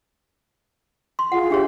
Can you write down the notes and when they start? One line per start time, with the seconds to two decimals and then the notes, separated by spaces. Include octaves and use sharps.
1.19 C6
1.32 F4 G#4 F#5
1.50 D4 G4 G#4 C#5 E5